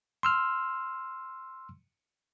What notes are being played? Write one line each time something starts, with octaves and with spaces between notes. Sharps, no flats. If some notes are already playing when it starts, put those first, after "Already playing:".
C6 E6 F6